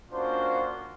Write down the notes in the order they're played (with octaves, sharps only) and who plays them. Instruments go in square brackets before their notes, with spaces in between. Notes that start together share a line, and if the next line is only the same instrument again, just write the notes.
[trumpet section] A#3 C#4 D4 F4 F#4 C5